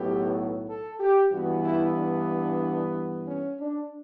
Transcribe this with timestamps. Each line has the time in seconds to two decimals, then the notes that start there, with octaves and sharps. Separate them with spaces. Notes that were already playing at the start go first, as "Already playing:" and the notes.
Already playing: B1 A2 F#3 B3 G4
0.68 A4
1.00 G4
1.32 G2 E3 B3 F#4
1.64 E4
1.97 D4
3.27 C#4
3.59 D4